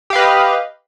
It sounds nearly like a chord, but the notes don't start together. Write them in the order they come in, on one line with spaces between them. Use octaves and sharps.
G4 F5 B4 D#5